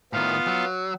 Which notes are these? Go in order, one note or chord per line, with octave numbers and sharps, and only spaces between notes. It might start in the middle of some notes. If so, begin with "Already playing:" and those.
A2 D#3 B3 F4 F5
F#3